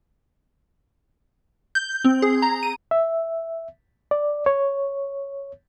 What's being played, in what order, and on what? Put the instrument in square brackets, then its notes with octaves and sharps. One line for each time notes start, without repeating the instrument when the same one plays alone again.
[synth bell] G6
C4
G#4
A#5
D#7
[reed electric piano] E5
D5
C#5